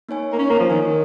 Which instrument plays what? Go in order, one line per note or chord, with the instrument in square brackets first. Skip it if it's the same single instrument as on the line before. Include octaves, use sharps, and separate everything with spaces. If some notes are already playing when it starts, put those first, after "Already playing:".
[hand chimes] A#3 D#4 C#5 G#5
[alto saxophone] A#3
C#4
A#3
F3
[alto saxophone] D#3 [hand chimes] D#4 A#4 C#5 G#5
[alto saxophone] D#3